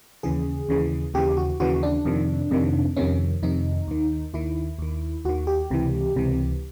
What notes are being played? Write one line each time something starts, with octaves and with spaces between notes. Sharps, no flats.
D#2 C#3 E3 G#4
D#2 C#3 E3
D#2 C#3 E3 G4
F#4
D#2 C#3 E3 F#4
D4
F2 C3 D#3
F2 C3 D#3
F2 C3 D#3 C#4
F2 C3 D#3 D#4
D#2 D#3
D#2 D#3 E4
D#2 D#3
D#2 D#3 F#4
G4
C#2 C3 E3
C#2 C3 E3